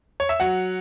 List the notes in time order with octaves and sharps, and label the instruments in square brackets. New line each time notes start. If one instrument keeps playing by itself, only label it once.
[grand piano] C#5
E5
F#3 F#5